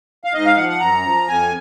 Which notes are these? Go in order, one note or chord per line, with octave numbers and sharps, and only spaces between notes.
F5
G#2 D#5
F5
F3 F#5
F#5
F#2 A#5
F3
F2 G#5